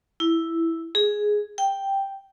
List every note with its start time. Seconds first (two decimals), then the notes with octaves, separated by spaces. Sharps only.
0.20 E4
0.95 G#4
1.58 G5